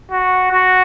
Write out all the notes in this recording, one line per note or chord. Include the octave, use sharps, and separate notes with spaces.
F#4
F#4